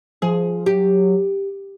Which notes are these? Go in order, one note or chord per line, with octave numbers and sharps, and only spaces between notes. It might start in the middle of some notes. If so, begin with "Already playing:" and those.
F3 G#4
F#3 G4